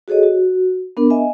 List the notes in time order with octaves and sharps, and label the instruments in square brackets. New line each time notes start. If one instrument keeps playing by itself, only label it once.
[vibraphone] F#4 G#4 A4 C#5 D#5
F#4
B3 D4 A#4
D#5 E5 G#5